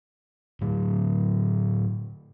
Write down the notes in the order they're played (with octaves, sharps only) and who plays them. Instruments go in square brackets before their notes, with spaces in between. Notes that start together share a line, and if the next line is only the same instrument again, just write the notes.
[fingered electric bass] A2 D3 F#3